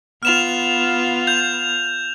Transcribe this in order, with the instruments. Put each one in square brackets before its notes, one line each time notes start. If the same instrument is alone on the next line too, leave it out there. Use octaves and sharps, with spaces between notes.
[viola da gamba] B3 F4 [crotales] F6 E7 F7
[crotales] G6 F7